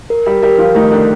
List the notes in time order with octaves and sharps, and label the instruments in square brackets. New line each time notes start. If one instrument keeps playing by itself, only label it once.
[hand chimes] A#4
[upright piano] G3 G4
[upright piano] G3 G4 [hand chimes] A#4
[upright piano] F3 F4
[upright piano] D#3 D#4 [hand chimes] A3
[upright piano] D3 D4